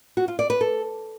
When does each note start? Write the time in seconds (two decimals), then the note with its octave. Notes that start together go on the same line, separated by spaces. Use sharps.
0.17 F#4
0.28 F4
0.39 D5
0.50 B4
0.61 A4